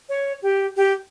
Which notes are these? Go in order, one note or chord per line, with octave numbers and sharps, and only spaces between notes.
C#5
G4
G4